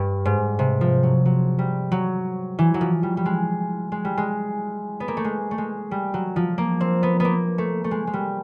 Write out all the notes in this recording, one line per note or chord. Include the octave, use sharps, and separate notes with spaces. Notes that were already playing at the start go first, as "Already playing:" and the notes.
Already playing: G2
G#2
C3
F3
F#3
F#3
G3
F#3
E3
F#3
F3
G3
G3
G#3
G#3
G3
G#3
B3
A#3
A3
G#3
A3
G#3
G3
F#3
F3
A#3
C4
B3
A#3 B3
A3
A3
G#3
G#3
G3